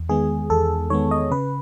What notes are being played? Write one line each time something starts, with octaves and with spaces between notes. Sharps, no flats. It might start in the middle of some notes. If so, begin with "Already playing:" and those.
Already playing: E2
D#3 G#3 B3 G#4
E2 A4
D#3 G#3 B3 C#5
D#5
C#3 B4